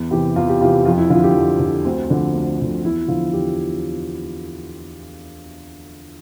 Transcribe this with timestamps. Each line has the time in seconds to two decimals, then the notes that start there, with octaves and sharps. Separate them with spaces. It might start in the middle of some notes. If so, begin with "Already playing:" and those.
Already playing: E2
0.11 C3 E3 G4
0.36 E2 F4
0.49 G4
0.61 C3 F4
0.65 E3
0.85 F2 F4
0.98 E4
1.10 D3 F3 F4
1.24 G4
1.35 F2
1.60 D3
1.65 F3
1.85 D2 C4
2.10 D3 F3
2.34 D2
2.60 D3 F3
2.84 E2 E4
3.08 D3 F3 F4
3.33 E2 G4